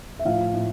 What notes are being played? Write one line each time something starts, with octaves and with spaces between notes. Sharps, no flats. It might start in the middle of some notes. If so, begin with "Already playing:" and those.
E5
A2 F3 F5
A2